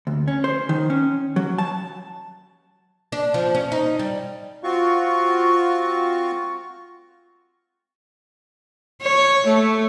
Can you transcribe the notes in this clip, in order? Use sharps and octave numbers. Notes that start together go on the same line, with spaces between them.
D2
C#4
C5
D#3
C#4
F#3
A5
D4
F3
C#4
D#4
G3
C4 F4 F#4 F5 C#6
C#5
A3